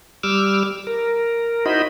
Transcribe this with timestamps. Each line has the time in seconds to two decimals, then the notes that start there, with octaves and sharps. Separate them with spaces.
0.23 G3 D6 E6 F6
0.87 A#4
1.66 D#4 E4 F#4 C5 D#5 B5